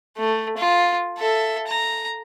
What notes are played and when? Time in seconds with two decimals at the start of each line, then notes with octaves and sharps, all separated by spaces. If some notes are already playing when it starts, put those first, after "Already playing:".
0.18 A3
0.57 F4
1.18 A4 E5
1.68 A#5